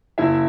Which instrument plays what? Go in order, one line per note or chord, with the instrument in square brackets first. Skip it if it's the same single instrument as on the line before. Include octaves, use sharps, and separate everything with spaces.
[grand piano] F#1 E4 E5